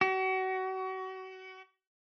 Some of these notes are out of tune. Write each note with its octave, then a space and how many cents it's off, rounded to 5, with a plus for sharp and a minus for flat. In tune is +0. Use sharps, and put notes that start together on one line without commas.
F#4 +30